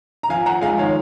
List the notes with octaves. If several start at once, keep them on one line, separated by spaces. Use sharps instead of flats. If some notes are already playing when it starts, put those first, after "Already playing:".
A#5
F3 F5 G#5
F3 F#5 A#5
G#3 F5 G#5
D#3 C#5 F5